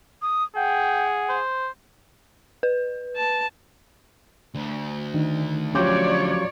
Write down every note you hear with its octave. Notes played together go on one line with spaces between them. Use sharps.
D#6
G#4 F#5 G5
C5
B4
A5
D2
D#3 D4 D#4
F3 F#3 C#4 G4 C#5 D5 D6 G6